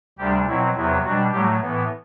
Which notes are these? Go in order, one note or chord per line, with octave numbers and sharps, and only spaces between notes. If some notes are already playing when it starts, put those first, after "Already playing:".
D2 C3 G3 D4 G4
B2 F#3 C4 E4
E2 C3 F#3 B3 E4
B2 F#3 G3 D4 F#4
A2 F#3 G3 A3 G4
A2 E3 B3